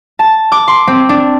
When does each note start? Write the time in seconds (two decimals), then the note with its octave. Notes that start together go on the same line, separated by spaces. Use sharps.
0.19 A5
0.52 D6
0.68 C6
0.87 C4
1.09 D4